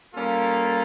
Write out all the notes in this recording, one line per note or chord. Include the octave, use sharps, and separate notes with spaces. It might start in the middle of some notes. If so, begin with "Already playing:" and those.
G3 A#3 C#4 F4 A4